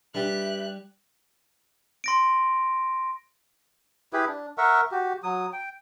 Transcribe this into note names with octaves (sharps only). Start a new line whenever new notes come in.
G3 D4 G4 B4 E5 F#6
C6 A#6 D7
E4 G4 G#4 B4
D4
A#4 E5 F#5 C#6
F#4 G4
F#3 D#6
G5